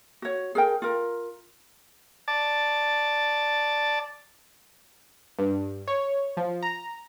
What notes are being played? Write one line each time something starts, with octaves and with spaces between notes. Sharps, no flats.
F#4 C#5
G#4 A#4 G5
F4 A#4
D5 A5
G2
C#5
F3
A#5